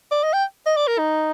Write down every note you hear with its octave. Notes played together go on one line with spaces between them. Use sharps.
D5
D#5
G5
D#5
D5
A#4
D#4